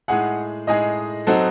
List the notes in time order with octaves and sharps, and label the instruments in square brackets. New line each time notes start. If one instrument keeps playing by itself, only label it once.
[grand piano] A2 G#3 D#4 G#4 [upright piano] F#5
[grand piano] A2 G#3 D#4 G#4 [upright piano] D#5
[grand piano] F#3 C4 D#4 F#4 A4